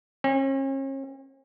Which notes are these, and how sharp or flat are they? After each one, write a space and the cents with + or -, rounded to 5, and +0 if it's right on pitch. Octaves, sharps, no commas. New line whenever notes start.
C#4 -40